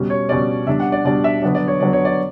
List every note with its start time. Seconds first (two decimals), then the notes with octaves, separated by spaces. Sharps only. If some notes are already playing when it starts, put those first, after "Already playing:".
Already playing: B2 G3 C#4
0.10 C#5
0.29 B2 G3 C#4 D5
0.67 B2 G3 D4 E5
0.80 F#5
0.92 D5
1.05 B2 G3 D4 D5
1.24 E5
1.42 D3 F#3 B3 D5
1.55 D5
1.68 C#5
1.80 D3 F#3 B3 D5
1.93 C#5
2.05 D5